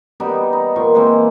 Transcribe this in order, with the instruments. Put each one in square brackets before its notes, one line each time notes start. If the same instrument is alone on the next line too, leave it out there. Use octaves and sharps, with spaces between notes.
[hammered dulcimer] G3 B3 D#4 G4
D#4
A#2 F3 F4 C#6
E3 G#3 A#3 C4